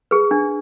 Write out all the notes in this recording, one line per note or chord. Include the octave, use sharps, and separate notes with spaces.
G#4 B4
D4